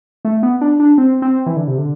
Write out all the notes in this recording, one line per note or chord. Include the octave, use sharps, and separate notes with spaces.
A3
B3
D4
D4
C4
C4
E3
D3
C3
D3